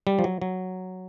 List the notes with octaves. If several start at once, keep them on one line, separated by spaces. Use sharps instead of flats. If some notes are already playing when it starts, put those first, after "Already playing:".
G3
F3
F#3
F#3